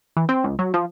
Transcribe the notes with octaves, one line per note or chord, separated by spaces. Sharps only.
E3
C4
C#2
F#3
F3